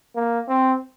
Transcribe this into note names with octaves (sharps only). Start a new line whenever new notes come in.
A#3
C4